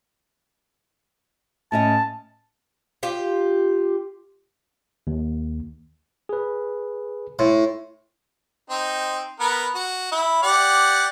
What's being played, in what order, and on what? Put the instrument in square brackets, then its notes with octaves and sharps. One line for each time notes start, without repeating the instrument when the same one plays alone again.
[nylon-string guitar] A2 C#4 D#5 [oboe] A5
[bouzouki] F4 G4
[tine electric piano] D#2
G#4 B4
[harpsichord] A2 [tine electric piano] C6
[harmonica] C4 D#4
B3 A#4 B4
F#4
E4
G4 D5 F#5